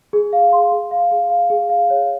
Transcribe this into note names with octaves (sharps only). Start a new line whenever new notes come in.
G#4
F5
C6
G#4
F5
G#4
F5
G#4
F5
C#5